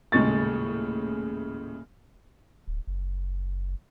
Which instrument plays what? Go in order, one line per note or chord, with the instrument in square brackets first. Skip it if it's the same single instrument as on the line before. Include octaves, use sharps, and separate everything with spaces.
[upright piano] D#1 A2 C#3 G#3 C#6 A6
[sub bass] D1
F#1